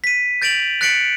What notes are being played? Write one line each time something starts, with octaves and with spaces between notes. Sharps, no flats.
B6 D#7
G6 A6 D7 F7 F#7
F#6 A6 B6 C#7 D7 F#7